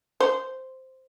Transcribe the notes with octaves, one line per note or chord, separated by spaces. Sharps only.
C5